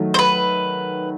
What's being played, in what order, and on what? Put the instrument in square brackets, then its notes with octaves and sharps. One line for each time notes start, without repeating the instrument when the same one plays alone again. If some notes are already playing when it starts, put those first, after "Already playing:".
Already playing: [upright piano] D#3 F#3 A3
[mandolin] C5
B4